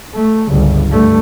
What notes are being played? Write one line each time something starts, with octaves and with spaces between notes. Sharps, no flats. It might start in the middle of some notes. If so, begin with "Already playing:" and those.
A3
G1 C#2
G2 A3